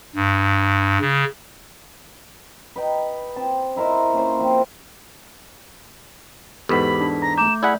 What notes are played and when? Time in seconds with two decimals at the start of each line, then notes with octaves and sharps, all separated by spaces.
0.15 G2
1.01 C#3
2.76 B4 D#5 G5 A#5
3.36 C4 A5
3.76 D#4 E4 A#4 C5
4.13 A#3 C#4 C5
4.39 F3 C4 E5
6.69 E2 G#2 G4 A4 B4 F#5 B5 B6
7.01 D4 B6
7.22 A#5 A#6
7.38 A3 A#5 D6 G6 E7
7.63 E4 G#4 D5 F#5 B5